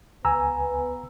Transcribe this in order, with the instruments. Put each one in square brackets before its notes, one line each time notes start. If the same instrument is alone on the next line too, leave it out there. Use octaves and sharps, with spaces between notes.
[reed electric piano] C#2 G#5 [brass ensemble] B3 B4 [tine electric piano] A#5 E6